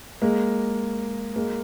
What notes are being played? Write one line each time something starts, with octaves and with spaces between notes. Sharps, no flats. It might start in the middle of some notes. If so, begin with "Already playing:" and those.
G#3 A#3
G#3 A#3